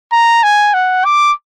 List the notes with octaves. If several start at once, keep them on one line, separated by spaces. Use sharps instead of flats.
A#5
G#5
F#5
D6